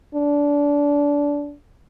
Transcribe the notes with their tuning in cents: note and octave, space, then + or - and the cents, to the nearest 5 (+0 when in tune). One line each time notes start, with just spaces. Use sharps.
D4 -25